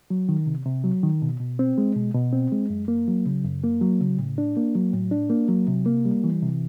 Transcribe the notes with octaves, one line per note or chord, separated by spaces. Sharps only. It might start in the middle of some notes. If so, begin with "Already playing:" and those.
F#3
D#3
C3
C3
F#3
D#3
B2
B2
C4
G#3
B2
B2
C4
G#3
F#2
A#3
F#3
C#3
F#2
A#3
F#3
C#3
A2
D4
A#3
F#3
A2
D4
A#3
F#3
C3
A#3
G3
E3
C3